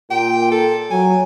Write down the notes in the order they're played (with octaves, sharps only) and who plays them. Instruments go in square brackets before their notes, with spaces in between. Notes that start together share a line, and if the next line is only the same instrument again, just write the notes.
[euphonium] A#2 [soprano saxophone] G5
[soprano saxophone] A4
[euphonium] F#3 [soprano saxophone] G#5